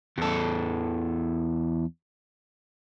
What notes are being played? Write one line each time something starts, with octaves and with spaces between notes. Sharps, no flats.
E2 A4